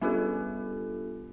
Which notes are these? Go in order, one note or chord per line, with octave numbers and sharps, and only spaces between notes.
G3 B3 D4 F4 G4 A4